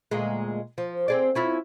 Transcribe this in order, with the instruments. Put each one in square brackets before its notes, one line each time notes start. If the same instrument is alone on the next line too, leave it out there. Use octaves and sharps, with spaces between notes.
[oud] D2 A#2 G#3
F3
C4 G#4 D5
C#4 E4 F4